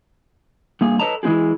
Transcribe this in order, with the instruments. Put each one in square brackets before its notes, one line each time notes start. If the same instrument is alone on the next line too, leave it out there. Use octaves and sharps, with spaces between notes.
[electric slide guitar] G2 A#3 G#4
A4 B4 C#5 D#5 A5 A#5
E3 G#3 C4 G4 G#4